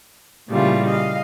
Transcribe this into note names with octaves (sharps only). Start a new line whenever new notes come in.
A#2 C#3 E3 G3 A3 F4
D#5 F5